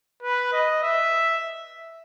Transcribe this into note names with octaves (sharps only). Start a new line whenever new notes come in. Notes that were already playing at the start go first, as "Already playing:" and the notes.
B4
D#5
E5